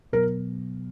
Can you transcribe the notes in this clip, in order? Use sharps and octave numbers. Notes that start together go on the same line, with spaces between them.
B2 F#3 B3 A#4